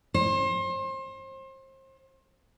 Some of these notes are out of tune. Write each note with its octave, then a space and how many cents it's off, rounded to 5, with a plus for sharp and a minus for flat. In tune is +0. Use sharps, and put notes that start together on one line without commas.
C5 +35